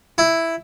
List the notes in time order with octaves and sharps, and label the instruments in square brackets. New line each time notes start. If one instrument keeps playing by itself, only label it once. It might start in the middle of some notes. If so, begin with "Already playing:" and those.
[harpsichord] E4